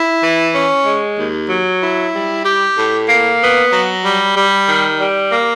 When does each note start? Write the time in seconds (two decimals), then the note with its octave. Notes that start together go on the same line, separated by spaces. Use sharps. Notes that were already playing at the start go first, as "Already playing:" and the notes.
Already playing: E4
0.22 E3
0.54 C#4
0.85 G#3
1.17 D#2
1.49 F#3
1.81 E4
2.13 G3
2.45 G4
2.76 A2
3.09 A#3
3.41 B3
3.72 F#3
4.03 G3
4.35 G3
4.67 D#3
4.99 G3
5.30 A#3